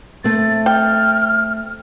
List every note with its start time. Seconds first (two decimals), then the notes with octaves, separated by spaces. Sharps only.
0.24 A3 C4 A6
0.66 G5 F6